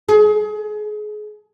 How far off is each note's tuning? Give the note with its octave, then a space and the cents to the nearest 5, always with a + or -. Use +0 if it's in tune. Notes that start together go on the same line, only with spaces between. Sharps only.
G#4 +30